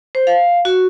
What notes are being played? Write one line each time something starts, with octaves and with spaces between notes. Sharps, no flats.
C5
F5
F#4